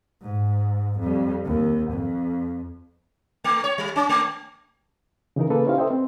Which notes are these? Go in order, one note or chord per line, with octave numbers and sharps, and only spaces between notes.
G#2
F2 G3
D#2
F2
A3
C#5
G3
C#4
A3
C#3 E3 D#4 A#4
C#3 A#3 C#4 G#4 A4 B4
C#4 D#4 E4 G4 C5 F5
A4 B4 C5 D#5 E5 G5
C4